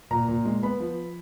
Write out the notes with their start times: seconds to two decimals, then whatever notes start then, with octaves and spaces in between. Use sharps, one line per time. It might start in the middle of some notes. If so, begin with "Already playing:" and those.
0.11 A#2 A#5
0.28 A#2
0.45 G#3
0.63 B3 B5
0.80 F3